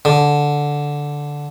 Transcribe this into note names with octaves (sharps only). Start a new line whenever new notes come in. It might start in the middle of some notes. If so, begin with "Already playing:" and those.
D3